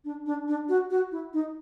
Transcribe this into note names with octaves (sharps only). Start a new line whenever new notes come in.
D4
D4
D4
F#4
F#4
E4
D#4